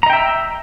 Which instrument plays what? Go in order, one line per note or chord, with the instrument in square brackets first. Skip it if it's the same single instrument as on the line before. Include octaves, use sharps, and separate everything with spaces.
[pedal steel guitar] A#5
D#5
G5
E5
E6